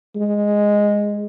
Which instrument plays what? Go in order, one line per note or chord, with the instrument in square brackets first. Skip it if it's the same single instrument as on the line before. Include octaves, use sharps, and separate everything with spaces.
[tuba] G#3